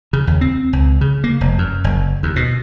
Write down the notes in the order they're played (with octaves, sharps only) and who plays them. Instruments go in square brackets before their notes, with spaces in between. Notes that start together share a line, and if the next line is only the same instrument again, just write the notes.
[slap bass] C#3
D#2
C4
C#2
C#3
A#3
F1
F#2
F#1
D#2
B2